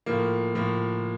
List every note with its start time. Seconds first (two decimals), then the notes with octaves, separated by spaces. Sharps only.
0.06 A2 F3 A#3
0.55 A2 F3 A#3